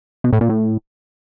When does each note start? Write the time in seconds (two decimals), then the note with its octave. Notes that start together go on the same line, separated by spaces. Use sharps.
0.24 B2
0.33 A2
0.41 A#2
0.49 A2